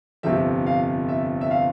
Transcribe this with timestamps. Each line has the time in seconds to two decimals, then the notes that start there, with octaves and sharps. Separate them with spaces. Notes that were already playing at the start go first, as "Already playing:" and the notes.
0.23 G1 F2 C3 E5
0.66 F5
1.09 E5
1.41 E5
1.51 F5